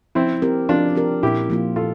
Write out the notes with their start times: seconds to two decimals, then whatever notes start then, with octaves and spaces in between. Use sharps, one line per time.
0.15 F3 C4 E4
0.42 C4 G4 A#4
0.69 F3 D4 F4
0.95 C4 G4 A#4
1.23 A#2 E4 G4
1.50 F3 A#3 F4
1.76 A#2 F4 A4